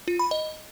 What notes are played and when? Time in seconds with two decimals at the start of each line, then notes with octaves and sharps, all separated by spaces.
0.08 F4
0.19 B5
0.31 D#5